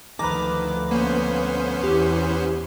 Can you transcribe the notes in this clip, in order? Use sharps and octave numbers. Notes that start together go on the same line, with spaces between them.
D2 D#3 F3 B4 A#5 D6
A#3 B3 C#4 C5
E2 E3 G4